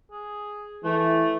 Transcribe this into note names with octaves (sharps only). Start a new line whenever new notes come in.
G#4
E3 A3